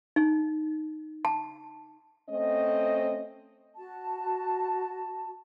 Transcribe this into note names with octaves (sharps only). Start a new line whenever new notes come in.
D#4
A5
A3 C4 C#4 D#5
F#4 A5